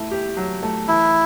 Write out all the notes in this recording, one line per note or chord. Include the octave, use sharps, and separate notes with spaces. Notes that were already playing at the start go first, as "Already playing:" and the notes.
Already playing: A3 E4
G4
F#3
A3
E3 E4